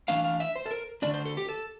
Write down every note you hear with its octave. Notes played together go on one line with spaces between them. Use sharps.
E3 A3 D4 F5
F5
E5
C5
A4
A#4
D3 A3 D4 D5
C5
A4
G4
A4